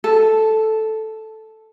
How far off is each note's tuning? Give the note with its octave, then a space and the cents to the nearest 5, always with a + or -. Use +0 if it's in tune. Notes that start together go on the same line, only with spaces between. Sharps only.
A4 -5